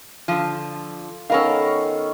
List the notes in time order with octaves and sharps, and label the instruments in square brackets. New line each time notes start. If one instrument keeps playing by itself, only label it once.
[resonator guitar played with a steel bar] D3 F3 [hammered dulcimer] F4
[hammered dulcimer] D#3 B3 C#4 [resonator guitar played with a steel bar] A4 A#4 F5